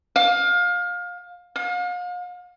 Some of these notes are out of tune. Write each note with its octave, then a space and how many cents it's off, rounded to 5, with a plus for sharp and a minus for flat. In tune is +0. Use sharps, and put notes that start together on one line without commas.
F5 +25
F5 +40